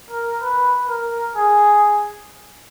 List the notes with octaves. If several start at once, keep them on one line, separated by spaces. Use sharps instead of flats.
A#4
B4
A#4
G#4